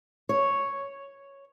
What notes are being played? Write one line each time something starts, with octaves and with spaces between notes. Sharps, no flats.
C#5